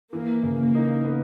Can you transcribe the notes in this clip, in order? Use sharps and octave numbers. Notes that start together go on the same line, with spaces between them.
E3 A#3
C#3
A#3
D#4
B3